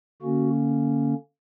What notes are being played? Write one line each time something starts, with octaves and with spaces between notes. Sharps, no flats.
D3 A#3 C#4 F#4